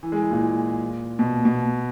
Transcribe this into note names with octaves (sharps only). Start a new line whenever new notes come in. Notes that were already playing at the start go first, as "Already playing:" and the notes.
E3
G#3
E3
A#2
B2
B2